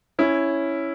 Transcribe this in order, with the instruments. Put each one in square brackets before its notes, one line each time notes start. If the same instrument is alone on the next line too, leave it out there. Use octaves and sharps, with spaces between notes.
[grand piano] C#4 E4